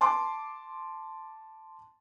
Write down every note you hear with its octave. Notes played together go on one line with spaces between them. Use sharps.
A5 C6 D6